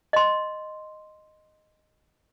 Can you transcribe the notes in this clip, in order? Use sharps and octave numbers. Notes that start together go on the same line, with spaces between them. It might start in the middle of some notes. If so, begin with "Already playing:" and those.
D#5 C6